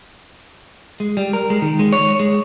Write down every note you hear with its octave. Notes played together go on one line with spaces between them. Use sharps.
G#3
G3
A#4
G#3
D#3
G#3
C#5
G#3